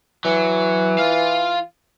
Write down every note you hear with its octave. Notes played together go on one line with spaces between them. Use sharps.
E3 F#3
F4 F5